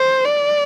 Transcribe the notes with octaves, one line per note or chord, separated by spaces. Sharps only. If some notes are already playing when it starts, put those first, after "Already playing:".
Already playing: C5
D5